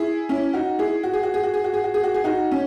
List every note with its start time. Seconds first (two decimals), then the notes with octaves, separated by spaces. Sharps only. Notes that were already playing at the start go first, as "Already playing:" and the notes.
Already playing: E4 G#4
0.29 C#4 E4
0.53 D#4 F#4
0.79 E4 G#4
1.03 F#4
1.13 G#4
1.23 F#4
1.34 G#4
1.43 F#4
1.54 G#4
1.64 F#4
1.74 G#4
1.84 F#4
1.94 G#4
2.04 F#4
2.14 G#4
2.24 D#4 F#4
2.52 C#4